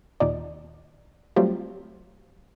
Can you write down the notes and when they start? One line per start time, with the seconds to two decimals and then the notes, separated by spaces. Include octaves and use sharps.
0.20 D#2 A#2 D#4 D5
1.36 F#3 G3 A3 C4 F4 G4